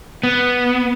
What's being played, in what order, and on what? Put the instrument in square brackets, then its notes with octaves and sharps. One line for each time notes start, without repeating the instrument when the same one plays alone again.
[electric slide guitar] B3